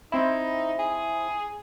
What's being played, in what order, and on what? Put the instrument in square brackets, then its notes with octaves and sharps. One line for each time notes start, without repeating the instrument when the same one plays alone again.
[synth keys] C4 E4 [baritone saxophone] D#4
[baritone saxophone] G#4